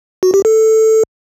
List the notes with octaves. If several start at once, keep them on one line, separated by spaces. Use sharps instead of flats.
F#4
G4
A4